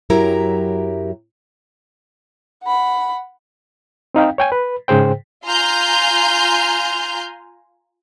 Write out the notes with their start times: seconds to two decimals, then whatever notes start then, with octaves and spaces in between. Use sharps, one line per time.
0.10 F#2 F#3 E4 G4 A#4 A#5
2.64 F#5 B5
4.15 C4 D#4 F5 G5
4.38 C#5 G5 G#5
4.52 B4
4.88 G#2 C#3 G#4 C5 G5
5.44 F4 G#5 A#5 C6 F6 G6